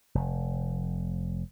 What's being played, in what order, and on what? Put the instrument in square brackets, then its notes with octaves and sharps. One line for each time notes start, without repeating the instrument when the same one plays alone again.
[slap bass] F1